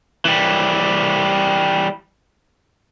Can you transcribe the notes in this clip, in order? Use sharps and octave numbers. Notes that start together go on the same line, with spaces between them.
E3 G3